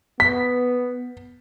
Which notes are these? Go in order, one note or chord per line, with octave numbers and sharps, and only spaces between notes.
B3 B6